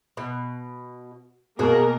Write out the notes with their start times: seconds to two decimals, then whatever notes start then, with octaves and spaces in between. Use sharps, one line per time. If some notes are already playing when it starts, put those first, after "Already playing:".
0.17 B2
1.59 B2 A#3 F#4 G#4 A#4